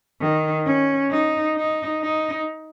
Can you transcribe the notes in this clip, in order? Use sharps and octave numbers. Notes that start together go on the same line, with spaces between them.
D#3
C#4
D#4
D#4
D#4